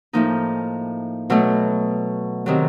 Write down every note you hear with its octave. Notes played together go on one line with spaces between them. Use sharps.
A2 F3 A#3 D#4
B2 F#3 A3
C3 D#3 F#3